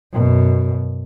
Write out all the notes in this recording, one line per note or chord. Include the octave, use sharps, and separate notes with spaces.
F#2 B2